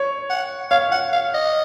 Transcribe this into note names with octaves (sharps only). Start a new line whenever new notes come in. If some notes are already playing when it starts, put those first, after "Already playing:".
Already playing: C#5
F#5
C#5 F5
F#5
F5
D#5